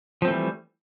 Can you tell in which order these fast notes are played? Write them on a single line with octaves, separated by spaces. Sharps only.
F3 C4 A3 E3 G3